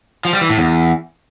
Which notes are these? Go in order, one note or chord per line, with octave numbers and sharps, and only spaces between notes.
F3
G3
E3
A2
E2